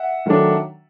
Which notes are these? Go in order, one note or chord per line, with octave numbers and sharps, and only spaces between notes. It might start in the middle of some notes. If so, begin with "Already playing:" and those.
Already playing: E5 F#5
D#3 F#3 A3 D4